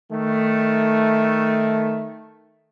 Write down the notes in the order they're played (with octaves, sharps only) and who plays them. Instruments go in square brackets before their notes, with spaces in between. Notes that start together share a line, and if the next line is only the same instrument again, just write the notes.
[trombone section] D#3 A3